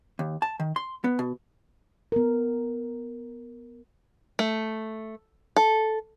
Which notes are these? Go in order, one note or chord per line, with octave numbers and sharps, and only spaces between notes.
D#2
A5
D#3
C6
B3
B2
B3 A#4
A3
A4